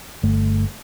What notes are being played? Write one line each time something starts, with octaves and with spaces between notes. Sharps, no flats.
G1 A3